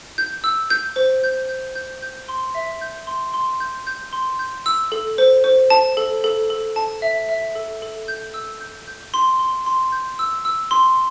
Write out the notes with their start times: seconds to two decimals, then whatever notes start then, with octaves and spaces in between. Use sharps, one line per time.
0.18 G6
0.44 E6
0.70 G6
0.96 C5
1.24 G6
1.49 G6
1.75 G6
2.02 G6
2.29 C6
2.55 E5
2.81 G6
3.07 C6
3.34 C6
3.60 G6
3.87 G6
4.13 C6
4.39 G6
4.66 E6
4.92 A4
5.18 C5
5.44 C5
5.70 A5
5.97 A4
6.24 A4
6.50 A4
6.76 A5
7.02 E5
7.29 E5
7.55 A4
7.82 A4
8.08 G6
8.34 E6
8.61 G6
8.87 G6
9.14 C6
9.39 C6
9.66 C6
9.92 G6
10.19 E6
10.45 E6
10.71 C6